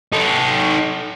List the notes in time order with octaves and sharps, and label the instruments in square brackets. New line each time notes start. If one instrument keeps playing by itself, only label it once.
[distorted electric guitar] D#4 A4